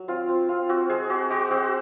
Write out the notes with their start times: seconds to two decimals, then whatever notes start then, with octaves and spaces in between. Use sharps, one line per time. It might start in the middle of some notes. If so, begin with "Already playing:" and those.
Already playing: F#3
0.08 C4 F4
0.29 C4
0.49 C4 F4
0.69 C4 F#4
0.89 G#3 G#4
1.10 C4 F#4
1.30 G#3 F#4
1.50 C4 F#4